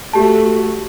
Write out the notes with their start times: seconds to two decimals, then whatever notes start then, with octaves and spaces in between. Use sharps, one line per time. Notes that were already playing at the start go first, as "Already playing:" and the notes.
0.13 A3 F#4 G4 A5